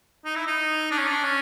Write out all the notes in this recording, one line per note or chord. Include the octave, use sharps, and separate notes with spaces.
D#4
E4
D#4
D4
C#4
D4
C#4